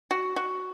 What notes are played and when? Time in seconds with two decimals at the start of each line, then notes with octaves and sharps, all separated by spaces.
0.11 F#4
0.36 F#4